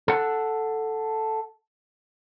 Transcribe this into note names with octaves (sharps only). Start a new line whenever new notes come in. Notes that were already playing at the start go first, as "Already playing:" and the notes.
A4 F#5